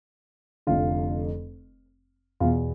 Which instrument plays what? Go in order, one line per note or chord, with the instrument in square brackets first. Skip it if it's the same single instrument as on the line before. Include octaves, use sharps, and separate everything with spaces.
[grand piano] F1 F2 D3 F4
E2 B2 F4